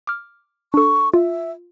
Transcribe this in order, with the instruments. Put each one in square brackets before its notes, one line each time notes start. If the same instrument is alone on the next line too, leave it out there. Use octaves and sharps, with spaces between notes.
[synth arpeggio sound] D6 F6
[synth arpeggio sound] D4 A4 [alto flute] C#6
[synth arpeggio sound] F4 [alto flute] E5